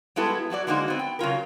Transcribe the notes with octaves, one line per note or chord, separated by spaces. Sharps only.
G3 G#3 B3 E4 F#4 A4
F#3 E4 F#4 D5
D3 G#3 A#3 D#4 F#4 C5
B3 C4
G5
C#3 F#3 F4 A#4